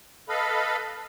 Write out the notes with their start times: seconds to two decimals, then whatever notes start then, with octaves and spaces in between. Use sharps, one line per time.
0.29 A4 B4 D#5 F5 B5